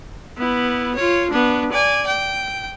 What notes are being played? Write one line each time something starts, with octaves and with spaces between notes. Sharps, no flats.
B3 E4
F4 C#5
B3 D4
D5 G#5
G5